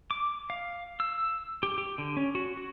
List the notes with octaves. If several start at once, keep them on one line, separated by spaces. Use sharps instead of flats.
D6
F5
E6
G4
G4
D3
C#4
F#4
F#4